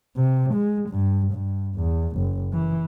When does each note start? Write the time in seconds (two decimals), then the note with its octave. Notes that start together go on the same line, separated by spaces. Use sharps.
0.17 C3
0.54 G#3
0.90 G2
1.32 G2
1.76 E2
2.18 F#1
2.53 E3